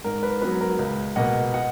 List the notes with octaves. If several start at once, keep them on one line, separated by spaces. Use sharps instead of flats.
G#2 A#4
B4
F#3 B3 B4
A#4
C#2
B2 A#3 D#5 F#5
D#5 F#5